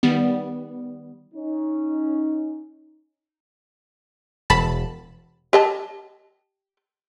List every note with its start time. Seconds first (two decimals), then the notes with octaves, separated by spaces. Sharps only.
0.03 D#3 G3 B3
1.35 C#4 D#4
4.50 E1 A5 B5
5.53 G4 D#5 A5